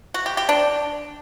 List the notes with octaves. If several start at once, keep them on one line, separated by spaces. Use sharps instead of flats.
F#4
G4
G4
D4